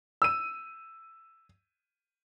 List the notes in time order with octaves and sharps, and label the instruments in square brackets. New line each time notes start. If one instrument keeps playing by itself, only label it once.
[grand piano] E6 D#7